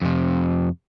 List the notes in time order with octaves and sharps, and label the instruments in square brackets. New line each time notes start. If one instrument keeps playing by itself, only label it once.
[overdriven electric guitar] F2 C3